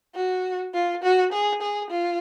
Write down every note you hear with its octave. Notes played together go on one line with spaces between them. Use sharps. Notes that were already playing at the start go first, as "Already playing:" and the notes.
F#4
F4
F#4
G#4
G#4
F4